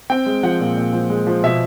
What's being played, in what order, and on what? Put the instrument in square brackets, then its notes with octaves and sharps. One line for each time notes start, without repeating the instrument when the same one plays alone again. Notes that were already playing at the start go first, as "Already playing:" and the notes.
[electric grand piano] C4 G5
G#3
F3 F#5
A#2
A#2
F3
G#3
F3
B2 E5